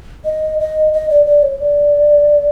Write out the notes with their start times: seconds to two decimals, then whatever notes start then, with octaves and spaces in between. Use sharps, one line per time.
0.25 D#5
0.60 D#5
0.93 D#5
1.10 D5
1.26 D5
1.43 C#5
1.60 D5